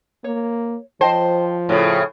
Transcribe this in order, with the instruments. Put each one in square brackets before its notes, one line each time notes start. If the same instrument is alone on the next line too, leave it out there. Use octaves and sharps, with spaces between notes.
[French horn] A#3 [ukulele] C#5
[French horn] F3 [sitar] C5 [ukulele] D#5 G5 A5
[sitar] A2 C#3 [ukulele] F#4